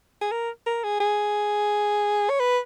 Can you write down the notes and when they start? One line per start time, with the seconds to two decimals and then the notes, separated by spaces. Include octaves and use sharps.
0.21 G#4
0.32 A#4
0.66 A#4
0.84 G#4
1.00 G#4
2.30 C#5
2.40 B4